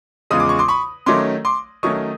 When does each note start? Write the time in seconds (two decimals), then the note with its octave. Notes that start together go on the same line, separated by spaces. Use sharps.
0.30 E2 C#3 F3 G#3 D#6
0.40 D6
0.49 C#6
0.59 C6 D6
0.68 B5 C#6
1.06 D#3 F#3 A3 C#4 C6 D6
1.45 C6 D6
1.83 D#3 F#3 A3 C#4 C#6 D#6